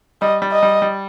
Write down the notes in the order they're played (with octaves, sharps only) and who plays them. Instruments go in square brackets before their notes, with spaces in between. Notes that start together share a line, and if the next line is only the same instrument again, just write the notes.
[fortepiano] G3 [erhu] D#5
[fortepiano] G3
[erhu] D#5
[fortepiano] G3
G3